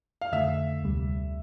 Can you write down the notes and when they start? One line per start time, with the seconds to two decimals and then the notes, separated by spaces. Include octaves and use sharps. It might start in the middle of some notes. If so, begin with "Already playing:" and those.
0.21 F5
0.32 F2 D3 A3 E5
0.82 D2 C3 G3